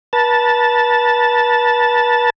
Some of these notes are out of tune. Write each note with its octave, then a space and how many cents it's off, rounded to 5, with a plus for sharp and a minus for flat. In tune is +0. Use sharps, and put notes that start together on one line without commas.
B4 -40 A5 +0